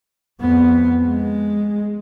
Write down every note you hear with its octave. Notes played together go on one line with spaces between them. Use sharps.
F2 B3
G#3